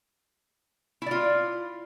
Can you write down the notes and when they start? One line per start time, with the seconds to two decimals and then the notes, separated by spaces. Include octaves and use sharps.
1.02 E4
1.06 D5
1.11 F4